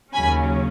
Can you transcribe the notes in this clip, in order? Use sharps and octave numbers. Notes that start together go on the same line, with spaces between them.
D#2 C#3 F#3 C#4 G#5 B5